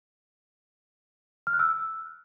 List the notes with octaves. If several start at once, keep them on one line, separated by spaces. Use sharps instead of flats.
F6
F#6
E6